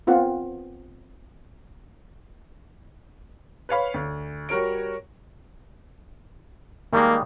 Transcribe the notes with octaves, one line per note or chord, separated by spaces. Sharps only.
B3 C4 F4 A#4 F#5
B4 C#5 F5 B5
D2
G3 F#4 A#4 C#5 D7
D#3 G3 G#3 A#3